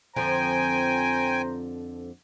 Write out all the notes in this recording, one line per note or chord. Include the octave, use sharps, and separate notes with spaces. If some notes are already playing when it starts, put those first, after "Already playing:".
F2 D3 F3 C5 G5 G#5 A#5